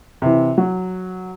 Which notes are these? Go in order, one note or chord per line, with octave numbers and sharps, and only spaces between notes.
C3 E3
F#3